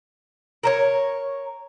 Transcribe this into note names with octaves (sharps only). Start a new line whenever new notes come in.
A#4 C5 C#5